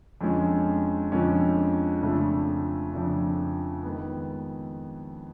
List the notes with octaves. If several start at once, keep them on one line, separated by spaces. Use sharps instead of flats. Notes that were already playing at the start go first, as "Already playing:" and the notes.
F2 D3 F3 G#3 C#4
F2 D3 F3 G#3 C#4
F2 C#3 F3 A3 D4
F2 C#3 F3 A3 D4
D#3 G#3 B3